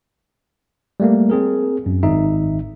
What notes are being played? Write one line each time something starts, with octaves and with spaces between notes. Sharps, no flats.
G3 A3 A#3
C4 G#4 A#4
F#2
G#1 G#2 D#4 E5